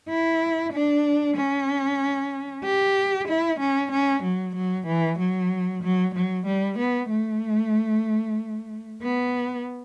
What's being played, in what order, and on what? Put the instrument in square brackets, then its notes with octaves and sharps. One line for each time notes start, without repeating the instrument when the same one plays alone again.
[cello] E4
D4
C#4
G4
E4
C#4
C#4
F#3
F#3
E3
F#3
F#3
F#3
G3
B3
A3
B3